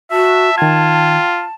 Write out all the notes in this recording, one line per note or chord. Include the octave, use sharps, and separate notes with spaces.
F#4 E5 A5
D#3 F4 G5 G#6